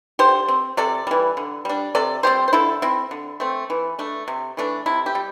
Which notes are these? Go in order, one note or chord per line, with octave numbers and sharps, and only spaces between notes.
D3 G4 C5
C4
C3 A4 D5
E3 G3
D3
G3 D4
C3 A4 D5
G3 C4 G4 C5
C5
D3 E4 A4
C4 E4
D3
A3 C4
E3
A3 D4
C3
E3 A3 D4
C3 E4
G4
G3